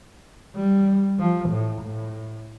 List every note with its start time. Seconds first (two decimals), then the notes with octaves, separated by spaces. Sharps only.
0.56 G3
1.19 F3
1.49 A2
1.81 A2